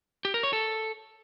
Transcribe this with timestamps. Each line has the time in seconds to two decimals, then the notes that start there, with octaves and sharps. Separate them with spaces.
0.25 G4
0.34 A#4
0.43 C#5
0.53 A4